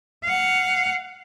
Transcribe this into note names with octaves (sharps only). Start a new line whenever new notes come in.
F5 F#5